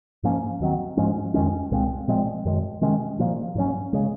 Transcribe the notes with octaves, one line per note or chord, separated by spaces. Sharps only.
G#2 F3 A#3 C#4
D#2 D#3 F#3 C4
G#2 F3 G#3 C#4
F2 D#3 G#3 C#4
C2 A#2 G#3 C4
A#2 F3 G#3 C4
F#2 D#3 G#3
C3 D#3 G#3 C#4
A#2 F3 A#3
G#2 F#3 C#4
C#3 G#3